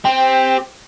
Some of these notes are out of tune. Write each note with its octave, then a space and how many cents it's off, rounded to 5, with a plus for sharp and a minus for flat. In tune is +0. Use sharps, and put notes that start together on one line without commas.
C4 +0 G4 +15